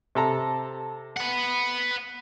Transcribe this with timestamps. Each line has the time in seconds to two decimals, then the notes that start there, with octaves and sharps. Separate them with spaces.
0.15 C3 A4 A#5
1.17 B4 F#5